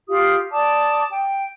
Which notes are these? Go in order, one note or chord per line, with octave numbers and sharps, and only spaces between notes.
F4 G4 F5 D#6
D5 A5 D6 D#6
G5